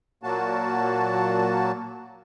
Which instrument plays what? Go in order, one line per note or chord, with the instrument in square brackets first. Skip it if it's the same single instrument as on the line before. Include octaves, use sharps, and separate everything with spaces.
[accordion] A#2 F#3 A#3 F#4 A5